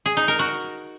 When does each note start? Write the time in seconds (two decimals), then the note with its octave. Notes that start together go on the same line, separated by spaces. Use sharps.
0.06 G#4
0.17 D#4
0.28 A#4
0.39 F#4